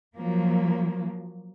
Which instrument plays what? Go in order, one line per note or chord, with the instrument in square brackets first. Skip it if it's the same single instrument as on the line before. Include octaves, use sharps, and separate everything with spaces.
[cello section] F3 F#3 A#3